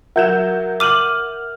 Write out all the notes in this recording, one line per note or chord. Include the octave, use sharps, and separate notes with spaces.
F#3 A#4 E5 F#5 G6 E7
D6 F6 D#7 F#7